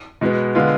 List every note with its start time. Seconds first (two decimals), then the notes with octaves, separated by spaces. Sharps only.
0.21 B2 G#3 B3
0.55 D3 G#3 B3 F4